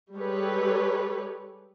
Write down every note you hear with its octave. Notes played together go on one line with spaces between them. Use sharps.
G3 G#3 G4 A4 B4 C#5